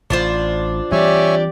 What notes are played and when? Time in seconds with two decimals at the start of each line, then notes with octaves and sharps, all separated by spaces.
0.10 A1 D4 F4 C5
0.92 E3 G3 C4 G4 C#5 D5 E5 G#5